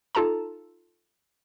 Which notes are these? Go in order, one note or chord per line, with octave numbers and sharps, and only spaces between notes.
D#4 F4 A4 A5 A#5